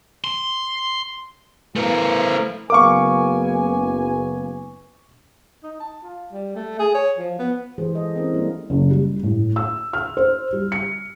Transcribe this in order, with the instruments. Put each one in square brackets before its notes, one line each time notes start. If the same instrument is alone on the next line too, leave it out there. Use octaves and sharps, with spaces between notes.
[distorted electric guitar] C6
[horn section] E3 F3 [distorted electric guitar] A3 A#4
[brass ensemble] F#1 B3 G#5 [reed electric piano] A#4 F5 [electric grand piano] C#6 D6
[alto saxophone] D#4
A5
F4
G3
A3
G#4
C#5
F3
B3
[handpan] E3 G#3 G4 G#4 C5
G#3 A4 D#5
C4 C#4 E4 A#4
G3 A#3 D4 E4
[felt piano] F#1
G3
A2
E6
F6
C5
G3
C#7